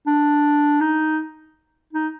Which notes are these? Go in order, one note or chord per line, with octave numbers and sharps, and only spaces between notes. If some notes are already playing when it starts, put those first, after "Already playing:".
D4
D#4
D#4